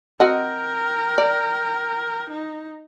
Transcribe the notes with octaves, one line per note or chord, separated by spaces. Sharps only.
C4 F#4 A#4 D#5 G5
D5
D#4